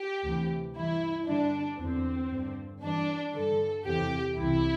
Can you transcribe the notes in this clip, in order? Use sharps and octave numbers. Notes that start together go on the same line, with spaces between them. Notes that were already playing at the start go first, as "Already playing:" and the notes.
Already playing: G4
D2 C3 E3
G2 E3 E4
G2 D3 D4
E2 D3 C4
G2 D3
G2 E3 D4
G2 D3 A4
E2 C3 E3 G4
C2 C3 E3 E4